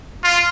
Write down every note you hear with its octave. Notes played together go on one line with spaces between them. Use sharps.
F4